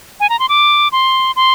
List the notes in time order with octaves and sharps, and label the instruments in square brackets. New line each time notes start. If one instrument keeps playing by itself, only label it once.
[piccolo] G#5
A#5
C6
D6
C6
C6